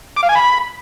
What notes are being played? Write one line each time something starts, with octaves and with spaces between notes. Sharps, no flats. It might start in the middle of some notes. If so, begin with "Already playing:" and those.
D6
F5
G#5
B5